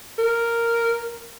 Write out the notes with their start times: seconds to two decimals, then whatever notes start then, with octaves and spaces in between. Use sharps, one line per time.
0.19 A#4